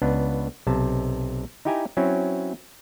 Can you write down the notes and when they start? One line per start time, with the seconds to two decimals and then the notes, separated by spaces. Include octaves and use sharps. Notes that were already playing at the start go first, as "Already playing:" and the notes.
0.02 C#2 B3 D4
0.67 B1 C3 A5
1.65 D#4 E4 G4 G5 G#5 A#5
1.97 F#3 C4 C#4 E4